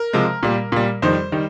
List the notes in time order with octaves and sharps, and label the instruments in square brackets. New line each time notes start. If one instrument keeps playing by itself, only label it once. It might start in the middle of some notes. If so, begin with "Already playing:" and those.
Already playing: [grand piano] A#4
C3 F3 G#3
A#2 G3
A#2 G3
F2 D#3 G3 C5
D#3 G3